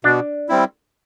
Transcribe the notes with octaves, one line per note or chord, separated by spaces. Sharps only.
B2 D4
G3 C4 E4